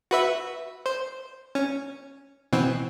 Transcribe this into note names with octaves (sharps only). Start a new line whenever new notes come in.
F#4 B4 E5
C5
C#4
B2 E3 C4